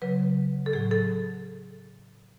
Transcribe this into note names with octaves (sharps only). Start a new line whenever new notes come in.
C#3 F#3 B4
A4
A2 F#3 G#4
A4